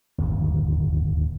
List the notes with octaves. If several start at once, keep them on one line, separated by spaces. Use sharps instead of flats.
D1 G1 D#2